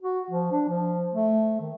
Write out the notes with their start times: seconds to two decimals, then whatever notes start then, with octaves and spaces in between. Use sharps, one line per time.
0.02 F#4
0.30 F3
0.52 D4
0.69 F3
1.14 A3
1.61 D#3